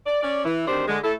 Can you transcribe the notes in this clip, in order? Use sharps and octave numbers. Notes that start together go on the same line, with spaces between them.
D5
C#4 D5
E3
D2 D#3 C4 D4 G4 C5
D3 G#3
A3 E4 A4